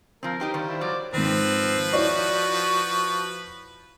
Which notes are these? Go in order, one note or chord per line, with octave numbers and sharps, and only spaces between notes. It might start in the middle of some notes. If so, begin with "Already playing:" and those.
F3 C4 A#4
D#4 G4 C5
D#3 G3 C5 F5
E4
F#3 D5
G#2 D#3 F3 C4 B4
E4 F#4 C#5 D5